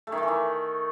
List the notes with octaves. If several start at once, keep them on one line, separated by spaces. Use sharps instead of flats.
A3
D#3
A3
E3
D#3